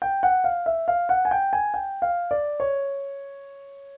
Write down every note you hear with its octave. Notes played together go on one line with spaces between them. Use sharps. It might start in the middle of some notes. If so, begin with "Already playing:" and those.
G5
F#5
F5
E5
F5
F#5
G#5
G5
G#5
G5
F5
D5
C#5